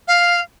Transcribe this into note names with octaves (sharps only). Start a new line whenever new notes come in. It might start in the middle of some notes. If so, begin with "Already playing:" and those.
F5